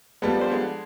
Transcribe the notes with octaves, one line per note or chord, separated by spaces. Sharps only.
F3 G3 G#3 B3 A4
D4 A#4 C5
D3 G#3